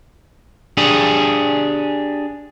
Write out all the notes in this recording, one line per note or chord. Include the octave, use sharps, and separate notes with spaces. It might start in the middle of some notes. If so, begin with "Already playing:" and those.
D4 G4 G#4